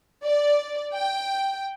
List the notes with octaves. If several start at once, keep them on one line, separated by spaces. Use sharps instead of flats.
D5
G5